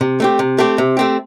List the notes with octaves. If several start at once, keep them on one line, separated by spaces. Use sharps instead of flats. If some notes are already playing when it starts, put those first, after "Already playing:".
C3
A3 C4 G4
C3
A3 C4 G4
C3
A3 C4 G4